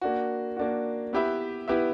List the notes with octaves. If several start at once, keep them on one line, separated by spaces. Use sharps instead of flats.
A#3 D4 F#4
A#3 D4 F#4
B3 E4 G4 B4 E5
B3 E4 G4 B4 E5